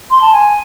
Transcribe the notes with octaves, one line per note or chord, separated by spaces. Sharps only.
C6
A5
G#5